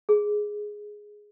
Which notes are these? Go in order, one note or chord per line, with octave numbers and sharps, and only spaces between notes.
G#4